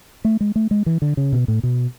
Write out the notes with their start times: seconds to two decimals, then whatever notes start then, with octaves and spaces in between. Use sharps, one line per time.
0.25 A3
0.41 G#3
0.56 A3
0.71 G#3
0.86 E3
1.02 D3
1.17 C#3
1.33 B2
1.48 A2
1.63 B2